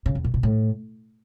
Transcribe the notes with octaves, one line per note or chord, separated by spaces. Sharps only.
C#3
E2
A#2
B2
A2